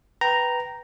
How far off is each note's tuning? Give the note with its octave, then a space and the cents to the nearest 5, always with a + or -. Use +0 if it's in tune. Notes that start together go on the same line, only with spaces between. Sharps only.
B4 +0 G5 -20 A#5 +0